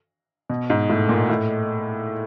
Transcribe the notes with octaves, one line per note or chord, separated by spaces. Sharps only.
B2
G#2
A2
A#2
A2